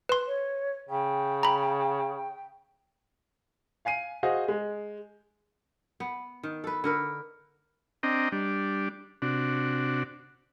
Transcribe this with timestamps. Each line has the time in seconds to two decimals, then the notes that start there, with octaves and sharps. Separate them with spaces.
0.09 B4 C6
0.26 C#5
0.89 C#3 G5
1.43 A#5 B5
3.85 F5 G#5 C7 D#7
4.23 F#4 G#4 C5 D#5 F5 F#5
4.48 G#3
6.00 B3
6.43 D#3
6.64 A4 B4
6.84 D3 A#4 B4
8.03 C4 D4 D#5 G5 A#5
8.32 G3 D4
9.22 C3 D4 F#4